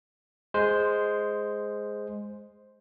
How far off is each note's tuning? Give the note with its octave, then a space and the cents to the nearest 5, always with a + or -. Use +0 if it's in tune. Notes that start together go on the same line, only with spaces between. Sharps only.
G#3 +0 C5 +0